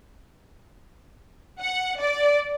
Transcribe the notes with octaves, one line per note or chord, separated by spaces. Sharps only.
F#5
D5